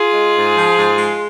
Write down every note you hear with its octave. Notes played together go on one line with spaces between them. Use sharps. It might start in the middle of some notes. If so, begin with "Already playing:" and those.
Already playing: F4 G#4
G#3
G#2
F3
G#2
G#3